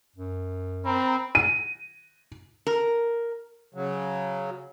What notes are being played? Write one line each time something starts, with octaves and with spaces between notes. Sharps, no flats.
F#2
C4 A#4 B5
D#7
A#4
C#3 F#3